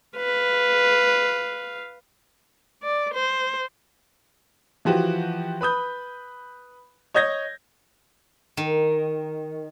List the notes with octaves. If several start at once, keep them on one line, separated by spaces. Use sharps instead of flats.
B4 F5
D5
C5
E3 F3 F#4 G4
B4 B5 D#6 G6
C#5 D#5 D#6 G6 G#6 A#6
D#3